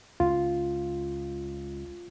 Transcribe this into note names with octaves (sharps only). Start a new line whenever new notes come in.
C#2 F4